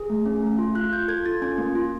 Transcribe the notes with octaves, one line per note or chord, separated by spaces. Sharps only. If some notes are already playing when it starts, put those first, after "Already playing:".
Already playing: G#4
A3
C#4
A3
F4
F4 F#6
F4 G6
A4 G#6
F4 A6
C#4 G#6
A#3
F4